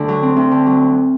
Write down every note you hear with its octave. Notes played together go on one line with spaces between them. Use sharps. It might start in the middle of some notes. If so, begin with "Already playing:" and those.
Already playing: D2 D3
F#3
C4
D2
D3
F#3